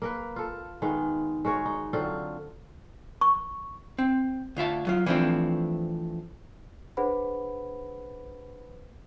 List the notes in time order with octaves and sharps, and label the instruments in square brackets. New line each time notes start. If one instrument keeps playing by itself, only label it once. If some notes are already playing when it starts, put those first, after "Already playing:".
[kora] A#3 A#4 B4
F4 A4
D#3 G#3 B3 F5
G#3 F#4 A#4 C#5
D#4
D3 F#3 C4 F4
[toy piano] C#6
[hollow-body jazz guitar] C4
D2 F4 E5 A5
F#3 F4
E3 F3 A3 C4 D4
[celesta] D4 G#4 B4 C5 F#5 B5